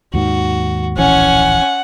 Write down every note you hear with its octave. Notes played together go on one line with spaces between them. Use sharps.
D#2 G#2 D#3 F#4
D1 A#1 E3 C#4 F#5 G#5